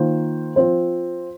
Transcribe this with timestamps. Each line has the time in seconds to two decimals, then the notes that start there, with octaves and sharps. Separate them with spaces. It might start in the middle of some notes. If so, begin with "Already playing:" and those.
Already playing: D#3 A#3 F4 C5
0.56 F3 C4 F4 C5